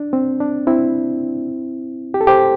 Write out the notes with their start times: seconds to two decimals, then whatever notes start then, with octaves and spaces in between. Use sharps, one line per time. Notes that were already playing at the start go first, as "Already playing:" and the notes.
Already playing: D4
0.13 C4
0.40 D4
0.67 C4 E4
2.14 G4
2.21 A4
2.27 G4 C5